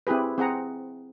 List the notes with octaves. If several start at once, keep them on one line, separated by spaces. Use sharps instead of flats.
C4 E4 G4 G#4 B4
C4 G#4 F#5 A#5